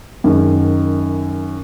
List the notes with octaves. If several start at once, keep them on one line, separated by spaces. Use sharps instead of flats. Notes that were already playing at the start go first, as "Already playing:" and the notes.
F#2 D#3 G#3